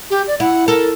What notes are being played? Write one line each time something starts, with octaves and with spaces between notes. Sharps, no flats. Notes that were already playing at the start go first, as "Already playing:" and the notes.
G4
D5
E4 F#5
A4 A#4